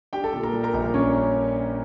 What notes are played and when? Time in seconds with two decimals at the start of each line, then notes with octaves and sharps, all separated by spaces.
0.13 D4 G4 G5
0.24 A4 A5
0.33 A#2
0.43 A#4 A#5
0.53 G3
0.63 A#4 A#5
0.74 A#1
0.84 A#3 A#4
0.94 C#4 D4 C#5